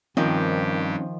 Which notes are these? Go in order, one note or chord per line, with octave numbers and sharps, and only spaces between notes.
G2 D#3 F3 C4 C#4 D#4 G4